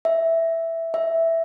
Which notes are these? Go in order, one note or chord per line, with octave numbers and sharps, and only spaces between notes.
E5
E5